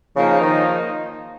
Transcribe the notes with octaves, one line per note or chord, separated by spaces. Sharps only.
C#3 F3 A#3 D#4
D#3